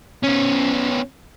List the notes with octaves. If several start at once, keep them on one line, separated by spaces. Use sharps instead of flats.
B3 C#4